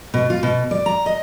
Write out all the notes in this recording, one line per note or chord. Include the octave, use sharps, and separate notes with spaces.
B2
F4
B2
D5
A#5
D#5